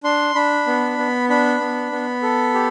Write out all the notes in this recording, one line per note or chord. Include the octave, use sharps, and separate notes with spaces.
D4 C6
D4 B5
B3
B3
D4 B5
B3
B3
A4
G4